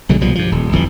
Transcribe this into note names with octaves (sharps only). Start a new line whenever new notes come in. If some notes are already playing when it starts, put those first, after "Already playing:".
B1 D3 F#3 G#3
C2 B2 F3 G3
G2 F3
D#1
G1 F2 C#3 E3